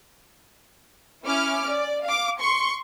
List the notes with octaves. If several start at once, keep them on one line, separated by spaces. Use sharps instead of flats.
C#4 E4 D6 F6
D5
F5 D6
C6 C#6 C#7